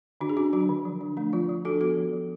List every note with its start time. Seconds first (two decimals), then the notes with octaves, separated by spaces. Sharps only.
0.21 D3 D4 F#4
0.29 G#4
0.37 C#4 D4 F#4
0.53 F#3 D4 F#4
0.69 D3
0.85 F3
1.01 D4
1.17 A3 D4
1.33 F3 F4
1.49 F3
1.65 D4 F#4 A4
1.81 B3 F#4 A4
1.97 F3
2.13 F3